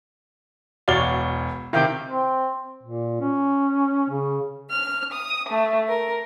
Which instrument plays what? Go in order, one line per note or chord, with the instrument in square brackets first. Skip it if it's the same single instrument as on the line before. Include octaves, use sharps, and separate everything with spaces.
[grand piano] E1 C#5 G7 [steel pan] F#4 D5 F5
[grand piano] C3 D#3 [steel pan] E4 F5 G5
[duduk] C4
A#2
C#4
C#3
[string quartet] F6
D#6
A3
A#4